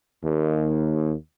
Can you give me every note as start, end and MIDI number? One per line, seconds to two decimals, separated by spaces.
0.23 1.13 39